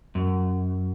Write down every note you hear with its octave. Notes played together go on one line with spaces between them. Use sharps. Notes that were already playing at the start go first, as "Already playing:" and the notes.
F#2